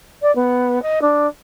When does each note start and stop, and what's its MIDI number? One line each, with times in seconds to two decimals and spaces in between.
0.22 0.33 74
0.35 0.81 59
0.82 0.99 75
1.01 1.27 62